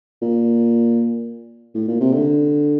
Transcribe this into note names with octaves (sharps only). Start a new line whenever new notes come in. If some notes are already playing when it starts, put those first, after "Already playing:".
A#2
A2
A#2
C3
D3